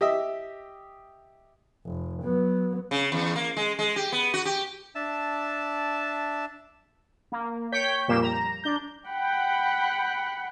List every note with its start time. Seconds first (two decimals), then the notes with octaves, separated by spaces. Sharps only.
0.01 G4 D#5 E5
1.85 F1
2.24 F#3 B3
2.91 C#3
3.12 E2
3.36 A#3
3.57 G#3
3.79 G#3
3.96 G4
4.12 B3
4.34 F#4
4.45 G4
4.95 D4 E5 A5
7.32 A#3
7.72 C#5 G5 G6 B6
8.08 F2 A#2 G3 A#3 G4 E7
8.23 A#5
8.64 D4 G6
9.07 F#5 G5 B5